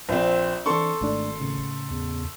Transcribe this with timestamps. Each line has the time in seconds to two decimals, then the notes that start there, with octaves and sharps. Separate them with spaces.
0.09 A#1 C4
0.66 E3 C4 D4 A4 C6 C#6
1.01 G#1 G#2 A3 D4
1.40 A2 C#3
1.91 E2